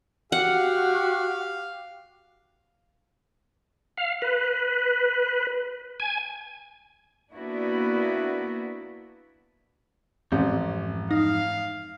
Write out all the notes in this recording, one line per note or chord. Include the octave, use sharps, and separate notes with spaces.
F#4 G4 F5 F#5
F5
B4
G#5
A#3 B3 D4 E4 F#4
A1 F2 G#2 C4
D#4 F5